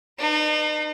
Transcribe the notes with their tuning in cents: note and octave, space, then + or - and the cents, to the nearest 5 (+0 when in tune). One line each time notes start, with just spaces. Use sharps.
D#4 -40 B4 +0